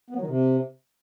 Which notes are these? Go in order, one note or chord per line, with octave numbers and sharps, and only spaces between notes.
B3
F#3
D#3
C3